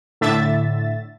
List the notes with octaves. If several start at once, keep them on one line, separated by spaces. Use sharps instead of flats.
A2 D3 E5 A6